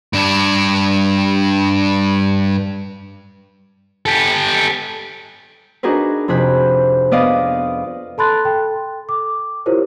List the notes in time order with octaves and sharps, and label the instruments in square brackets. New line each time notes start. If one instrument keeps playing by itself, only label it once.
[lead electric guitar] G2 D4
[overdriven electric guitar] G4 A4
[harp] D4 D#4 F#4 G#4 A#4 B4
F2 C3 G#4 B5 F#6
B3 B4 D5 D#5 F5
[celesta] A4 A5 B5 C6 F#6 A6
A4 G5
D6
E4 F4 G4 A#4 C5 C#5